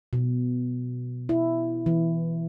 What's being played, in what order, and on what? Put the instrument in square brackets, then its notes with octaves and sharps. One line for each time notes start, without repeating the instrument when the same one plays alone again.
[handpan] B2
E4
E3